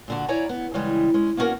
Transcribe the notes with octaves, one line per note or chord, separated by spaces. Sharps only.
A#2 D3 F#4
E4 C#5 D5 G#5 A#5
B3
C#3 E3 G3 G#3
G#3 C#4
A#3 B3 C#4 D4 F#4 A#4